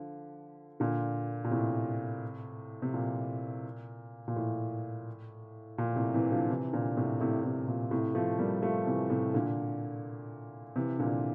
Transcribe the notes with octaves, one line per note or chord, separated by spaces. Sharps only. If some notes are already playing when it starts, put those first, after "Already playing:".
Already playing: D3 F3
A#2 D3
A#2
A2 C3
C3
A#2
A#2
A2
A#2
A2 C3
C3 E3
D3 F3
C3 E3
A#2 D3
A2 C3
A2 C3
A2 C3
A#2
A2 C3
F3 A3
G3 A#3
F3 A3
C3 E3
A2 C3
A#2 D3
C3 E3
A#2 D3